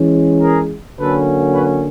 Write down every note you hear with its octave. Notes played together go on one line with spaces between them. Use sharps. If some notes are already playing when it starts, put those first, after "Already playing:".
Already playing: E3 G#3 C#4
G#4 A#4
D3 F#3 A#3 C#4 A4 B4
B4 C#5